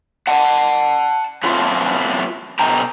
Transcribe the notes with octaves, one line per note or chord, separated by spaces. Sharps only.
F#5 A5
F#3 A3 B3 C4 F4
B2 A4 G5 A#5